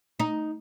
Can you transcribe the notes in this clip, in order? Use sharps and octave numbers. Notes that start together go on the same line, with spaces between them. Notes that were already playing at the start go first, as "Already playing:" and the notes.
D#4